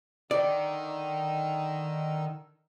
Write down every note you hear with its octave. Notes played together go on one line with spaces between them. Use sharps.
D3 D#3 D#4 D5 E6